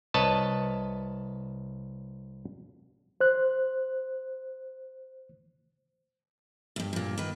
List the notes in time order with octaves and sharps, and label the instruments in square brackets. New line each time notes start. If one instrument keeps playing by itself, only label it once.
[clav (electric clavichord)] C2 B4 C#5 D#5 A5
[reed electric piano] C5 F#6
[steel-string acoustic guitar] D2 G2
G2 A#2
D#3 B4